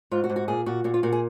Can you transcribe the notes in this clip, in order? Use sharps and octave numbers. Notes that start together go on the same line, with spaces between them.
G#2 F4
F#4
G#2
F#4
A#2 G#4
A#2 F#4
A#2 F#4
F4
A#2 F#4
G#4